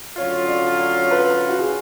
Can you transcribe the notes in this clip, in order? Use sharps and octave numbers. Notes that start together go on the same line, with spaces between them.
D3 F#3 C#4 F4 C#5
D5
C#5
B4
F#4
G#4